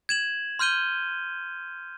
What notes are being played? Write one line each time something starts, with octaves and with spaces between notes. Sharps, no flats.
G#6 E7 F#7
C6 F6 G6 D#7 G7